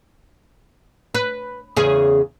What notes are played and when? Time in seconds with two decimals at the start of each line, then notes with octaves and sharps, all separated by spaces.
1.15 B4
1.76 E2 C#3 G#4